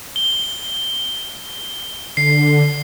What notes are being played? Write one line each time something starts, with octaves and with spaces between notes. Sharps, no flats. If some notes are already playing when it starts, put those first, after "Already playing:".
G7
D3 C7